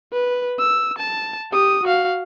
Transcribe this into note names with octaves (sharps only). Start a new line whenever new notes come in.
B4
E6
A5
G4 D#6
F#4 F5